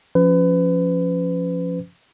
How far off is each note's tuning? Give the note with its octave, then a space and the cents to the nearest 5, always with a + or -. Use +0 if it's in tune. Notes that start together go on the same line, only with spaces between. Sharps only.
F3 +0 C#4 +5 B4 +30